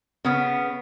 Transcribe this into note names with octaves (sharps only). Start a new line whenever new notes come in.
C#3 B3